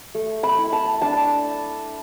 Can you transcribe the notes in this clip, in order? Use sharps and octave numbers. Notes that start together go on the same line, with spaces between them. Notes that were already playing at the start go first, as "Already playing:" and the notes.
A3
B5
E4
A5
D4 A5